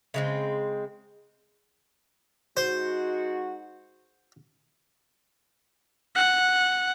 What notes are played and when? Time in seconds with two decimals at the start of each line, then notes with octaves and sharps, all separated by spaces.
0.14 C#3 G#3 C4
2.57 G#3 D#4 F#4 C5
6.16 F#5